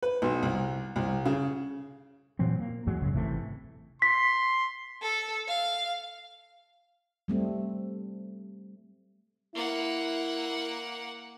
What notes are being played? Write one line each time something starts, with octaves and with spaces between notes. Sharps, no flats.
B4
B1
C2
C2
C#3
A#2 E3 F#3 C4
A#3
E2 G#2 F#3 G#3
F#1 C#2 C#3
G#1 C3 E3 A3
C6 B6
A4
F5
G3 A3 C4
A#3 E4 F#5